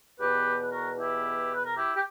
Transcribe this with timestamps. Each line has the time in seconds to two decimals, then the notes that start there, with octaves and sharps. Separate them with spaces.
0.20 E2 B2 G4 B4
0.62 B4
0.72 F#4 A#4
0.97 E4 G4
1.53 B4
1.64 A#4
1.75 E4 G4
1.95 G4